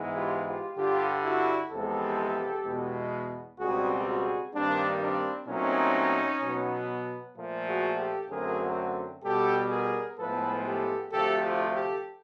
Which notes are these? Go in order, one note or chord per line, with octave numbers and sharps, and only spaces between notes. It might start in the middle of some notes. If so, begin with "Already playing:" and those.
Already playing: G#2 E3 G#3 B3
F4 G4
F4 G4
G2 D3 G3 F4 G4
E4 F#4
E2 C3 F3 G#3 B3 G4 A4
E2 B2 G#3 B3
C#2 B2 G3 C4 F#4 G#4
F#4 G#4
G2 D#3 G3 A#3 C4 D4
C4 D4
A#2 F#3 A3 C4 C#4 D#4
B2 F#3 B3
A#2 F3 A3
F#4 G#4
G4 A4
F#2 D3 F#3 A3 C4 G#4 A#4
B2 G3 B3 G4 A4
G#4 A#4
A2 F3 G#3 B3 A4 B4
G4 A4
D2 C3 F3 A3 G4 A4
F4 G4
G4 A4